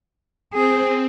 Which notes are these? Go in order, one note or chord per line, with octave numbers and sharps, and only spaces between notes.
C4 G#4